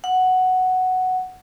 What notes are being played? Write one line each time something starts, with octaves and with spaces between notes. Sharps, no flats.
F#5